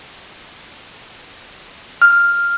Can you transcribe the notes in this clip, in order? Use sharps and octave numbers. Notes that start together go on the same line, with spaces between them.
F6